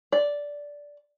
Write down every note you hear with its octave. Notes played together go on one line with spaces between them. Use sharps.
D5